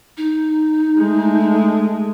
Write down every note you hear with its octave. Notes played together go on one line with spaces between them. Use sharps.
D#4
G#3 A3